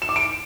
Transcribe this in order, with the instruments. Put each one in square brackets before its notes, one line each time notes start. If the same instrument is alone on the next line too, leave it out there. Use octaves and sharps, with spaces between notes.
[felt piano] E7
D6
D7